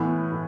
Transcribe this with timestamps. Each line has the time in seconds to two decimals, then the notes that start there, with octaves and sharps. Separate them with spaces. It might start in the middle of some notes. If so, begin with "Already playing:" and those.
Already playing: A2 E3 B3
0.32 A2